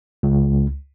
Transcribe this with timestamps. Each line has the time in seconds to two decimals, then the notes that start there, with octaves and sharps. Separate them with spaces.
0.23 C#2